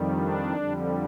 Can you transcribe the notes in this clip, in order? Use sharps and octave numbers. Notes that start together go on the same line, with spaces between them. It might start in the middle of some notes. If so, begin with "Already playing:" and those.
Already playing: F2 D#3 G3
D4
F2 D3 G3